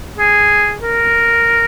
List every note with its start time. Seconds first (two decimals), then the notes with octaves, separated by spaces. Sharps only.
0.19 G#4
0.81 A#4